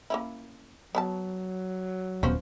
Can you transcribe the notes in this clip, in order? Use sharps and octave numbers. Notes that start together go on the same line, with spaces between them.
A#3 C#4 E4
F#3 B3 D5 A5
D#1 F3 B3 C#4 C5